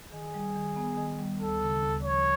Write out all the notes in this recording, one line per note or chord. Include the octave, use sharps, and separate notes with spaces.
D#3 G#4
G3
D#3
B3
D#3
G3
D2 A4
C#3
D2
F3 C#5